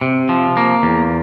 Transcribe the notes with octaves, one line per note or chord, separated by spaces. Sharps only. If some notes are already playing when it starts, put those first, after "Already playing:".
C3
F3
A#3
E2